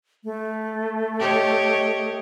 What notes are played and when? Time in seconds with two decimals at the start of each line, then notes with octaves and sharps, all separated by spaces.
0.24 A3
1.20 G4 C#5 D#5